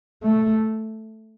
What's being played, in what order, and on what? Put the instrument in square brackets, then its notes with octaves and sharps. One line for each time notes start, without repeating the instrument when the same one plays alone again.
[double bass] A3